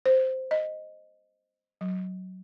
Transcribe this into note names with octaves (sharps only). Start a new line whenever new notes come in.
C5
D#5
F#3